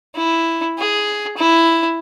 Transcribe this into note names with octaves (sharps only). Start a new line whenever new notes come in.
E4
G#4
E4